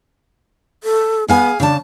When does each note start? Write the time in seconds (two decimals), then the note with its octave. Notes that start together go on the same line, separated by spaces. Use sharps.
0.83 A4
1.28 B3 G#4 F5 G#5
1.60 C#3 D4 A5